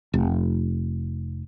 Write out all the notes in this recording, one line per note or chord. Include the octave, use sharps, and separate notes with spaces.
F1